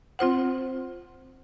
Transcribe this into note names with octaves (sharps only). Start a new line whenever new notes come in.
C4 F4 C5 F#5